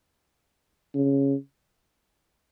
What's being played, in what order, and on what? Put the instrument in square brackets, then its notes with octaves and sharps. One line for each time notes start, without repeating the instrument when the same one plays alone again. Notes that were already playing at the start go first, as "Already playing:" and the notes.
[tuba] C#3